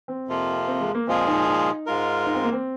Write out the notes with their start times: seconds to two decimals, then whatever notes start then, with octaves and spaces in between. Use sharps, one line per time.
0.08 C4
0.28 F2 C3 F3 A#3 F4
0.68 C4
0.80 G#3
0.95 A#3
1.07 A#2 F3 G#3 C4 F4 G#4
1.27 D#4
1.47 D#4
1.86 G#2 G#3 F4 A#4
2.25 D#4
2.35 C4
2.44 A#3
2.53 C4